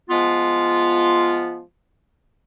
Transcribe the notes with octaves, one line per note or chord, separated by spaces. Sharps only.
F3 G#3 B3 F4